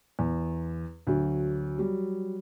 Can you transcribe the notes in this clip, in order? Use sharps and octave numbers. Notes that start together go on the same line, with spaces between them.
E2
D2 F#3
F#3 G3